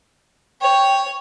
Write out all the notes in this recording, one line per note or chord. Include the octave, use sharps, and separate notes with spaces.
C#5 G5